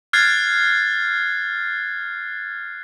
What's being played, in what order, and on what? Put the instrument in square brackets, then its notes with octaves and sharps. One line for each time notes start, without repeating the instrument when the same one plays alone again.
[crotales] F6 F#6 G#6 A6 C7